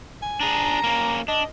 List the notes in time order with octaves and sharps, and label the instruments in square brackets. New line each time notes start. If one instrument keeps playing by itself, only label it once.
[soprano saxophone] G#5
[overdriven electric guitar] D4 G#4 [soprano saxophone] A#5
[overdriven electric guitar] A#3 C#4
[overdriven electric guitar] D4 [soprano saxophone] D#5